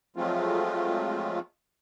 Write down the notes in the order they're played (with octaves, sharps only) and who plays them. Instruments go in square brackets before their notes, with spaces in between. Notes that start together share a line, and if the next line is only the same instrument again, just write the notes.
[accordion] F3 F#3 G#3 A3 C4 F4